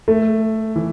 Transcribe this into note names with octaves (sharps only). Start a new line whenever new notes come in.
A3
E3